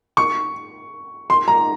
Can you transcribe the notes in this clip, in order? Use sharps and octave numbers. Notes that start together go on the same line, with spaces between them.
C#6
C6
A#5